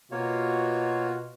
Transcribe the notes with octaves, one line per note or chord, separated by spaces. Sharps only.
B2 A#3 F4 F#4 C#5